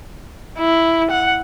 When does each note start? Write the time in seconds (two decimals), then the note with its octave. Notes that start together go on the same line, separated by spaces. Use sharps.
0.58 E4
1.10 F#5